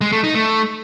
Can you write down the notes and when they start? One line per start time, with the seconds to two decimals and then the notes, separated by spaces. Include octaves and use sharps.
0.01 G#3
0.12 A3
0.24 D#4
0.35 A3